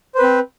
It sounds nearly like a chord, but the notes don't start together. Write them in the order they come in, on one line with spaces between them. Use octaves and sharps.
C5 B4 C4